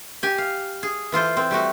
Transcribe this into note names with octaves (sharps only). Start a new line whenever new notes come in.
G4 G#5
F5
G#4
E3 F4 A4 C5
C4
G3 A3 F#4